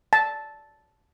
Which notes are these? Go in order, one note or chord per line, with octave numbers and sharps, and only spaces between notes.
A5